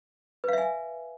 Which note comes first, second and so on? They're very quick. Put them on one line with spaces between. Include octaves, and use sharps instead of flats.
B4 F5 E5 G#5